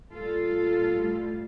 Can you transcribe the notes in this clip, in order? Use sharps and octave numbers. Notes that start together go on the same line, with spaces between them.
A#2 G3 F4 A4
A#2 G3
A2 G3